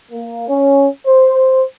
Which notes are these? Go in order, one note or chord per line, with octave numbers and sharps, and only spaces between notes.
A#3
C#4
C5